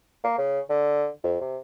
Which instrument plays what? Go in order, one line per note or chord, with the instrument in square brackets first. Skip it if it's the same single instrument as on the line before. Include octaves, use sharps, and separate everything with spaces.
[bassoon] A#3
C#3
D3
F2
C3